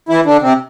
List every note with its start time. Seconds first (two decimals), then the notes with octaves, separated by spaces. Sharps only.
0.09 E3 E4
0.26 D3 D4
0.42 C3 C4